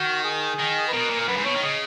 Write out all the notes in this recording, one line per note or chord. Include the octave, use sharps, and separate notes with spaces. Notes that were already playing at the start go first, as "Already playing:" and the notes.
Already playing: D#3 F#4
G#4
D#3
B4
B2 A#4
A#2
A#4
F#2 B4
G#2
B2 C#5
D#3
C#3 D#5